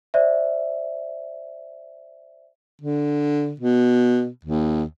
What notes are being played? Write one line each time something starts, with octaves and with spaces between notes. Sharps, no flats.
C5 D5 E5
D3
B2
D#2